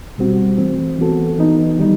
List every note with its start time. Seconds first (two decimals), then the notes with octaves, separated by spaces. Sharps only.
0.18 B2 G3 C4 F#4
0.58 E3 A3 C4
0.98 E3 B3 F#4 A4
1.38 E3 B3 D#4
1.78 D#3 G3 D#4